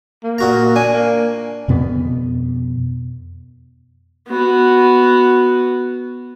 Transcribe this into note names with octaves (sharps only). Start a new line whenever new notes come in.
A#3
A#2 F#4 A#5
D4 G#5
A#3
F2 B2 B3
B3 F#4